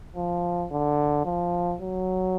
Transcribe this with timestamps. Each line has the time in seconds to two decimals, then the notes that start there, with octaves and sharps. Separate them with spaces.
0.16 F3
0.71 D3
1.26 F3
1.81 F#3